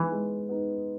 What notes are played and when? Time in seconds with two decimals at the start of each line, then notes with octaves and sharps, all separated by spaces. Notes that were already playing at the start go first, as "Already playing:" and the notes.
Already playing: E3 G#3 B3 D#4
0.12 G#3
0.49 B3 D#4